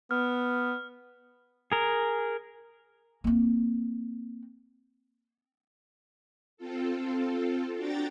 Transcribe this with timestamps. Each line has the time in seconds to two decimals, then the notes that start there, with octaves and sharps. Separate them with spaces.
0.11 B3 F6
1.72 G#4 A#4
3.24 A#3 C4
6.57 C4 F4 A4
7.75 D4 F#4 G5 A#5 A6